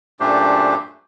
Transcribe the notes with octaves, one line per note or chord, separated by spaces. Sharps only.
F#2 A#2 A3 D4 G4 C5